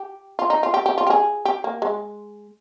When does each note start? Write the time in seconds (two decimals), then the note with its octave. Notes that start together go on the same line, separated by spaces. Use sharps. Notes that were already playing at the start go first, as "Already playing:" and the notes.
Already playing: G4
0.39 F4
0.50 D#4
0.63 F4
0.74 G4
0.86 G4
0.98 F4
1.07 G4
1.10 G#4
1.45 G4
1.64 A#3
1.82 G#3